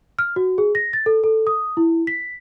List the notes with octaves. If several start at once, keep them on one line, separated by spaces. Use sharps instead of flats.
F6
F#4
G#4
A#6
A6
A4
A4
D#6
E4
B6